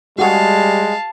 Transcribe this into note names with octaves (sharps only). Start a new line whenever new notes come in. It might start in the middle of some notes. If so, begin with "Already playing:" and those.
G3 G#3 F#4 G#4 F5 F#5 A5